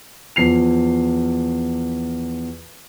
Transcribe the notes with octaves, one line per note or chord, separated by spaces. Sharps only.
E2 F3 C7 F7